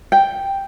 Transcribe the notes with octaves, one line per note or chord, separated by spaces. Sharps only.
G5